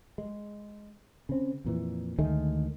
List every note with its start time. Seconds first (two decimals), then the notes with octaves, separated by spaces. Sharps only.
0.18 G#3
1.29 C#3 C4
1.65 F2 A#2 E3
2.18 D2 D#3 G#3 A3